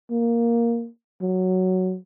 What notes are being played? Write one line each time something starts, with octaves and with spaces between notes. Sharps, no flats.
A#3
F#3